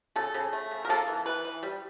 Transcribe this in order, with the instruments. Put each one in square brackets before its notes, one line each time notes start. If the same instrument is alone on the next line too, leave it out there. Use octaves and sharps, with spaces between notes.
[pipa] C#3 A4
C#3
A3
C#3
A#4
A#3 A4
E3
E3 B4
E3
G3